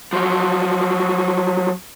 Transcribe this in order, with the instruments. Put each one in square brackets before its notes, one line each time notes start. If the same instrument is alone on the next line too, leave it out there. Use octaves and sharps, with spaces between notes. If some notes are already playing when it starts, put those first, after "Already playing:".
[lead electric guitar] F3 F#3